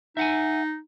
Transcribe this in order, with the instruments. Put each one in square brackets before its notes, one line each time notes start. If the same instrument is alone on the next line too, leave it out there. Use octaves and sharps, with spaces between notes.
[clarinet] D#4 [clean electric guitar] E5 F#5 G#5